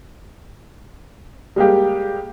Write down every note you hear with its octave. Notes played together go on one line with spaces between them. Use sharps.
G3 G#3 A#3 G4